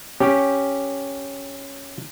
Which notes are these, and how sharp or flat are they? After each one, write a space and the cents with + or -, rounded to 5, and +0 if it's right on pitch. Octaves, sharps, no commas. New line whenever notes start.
C#4 +0 G4 +0